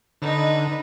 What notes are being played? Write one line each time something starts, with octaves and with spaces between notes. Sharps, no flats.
D3 D#4 B4 D#5